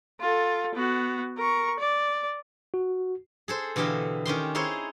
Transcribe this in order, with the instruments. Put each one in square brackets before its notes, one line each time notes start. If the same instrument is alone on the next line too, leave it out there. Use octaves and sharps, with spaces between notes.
[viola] F4 A4
B3 F#4
A#4 C#6
D5
[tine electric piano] F#4
[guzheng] G#4 A4 C5
B2 D3 E3 G4 D#5 F5
D#3 C#4 G4 C6
D#4 E4 G#4 C5 C#5